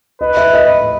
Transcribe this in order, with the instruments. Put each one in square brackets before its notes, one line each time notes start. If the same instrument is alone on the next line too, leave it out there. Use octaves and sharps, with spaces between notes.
[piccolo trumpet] B4 [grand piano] D#5
[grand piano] E5
D#5